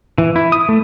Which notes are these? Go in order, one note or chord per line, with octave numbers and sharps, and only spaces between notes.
E3
E4
D#6
A3